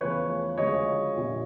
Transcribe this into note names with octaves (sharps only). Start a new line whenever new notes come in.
E2 C#3 F3 A3 B4 C#5
D2 C#3 F3 G#3 C#5 D#5
A#1 A#2 G3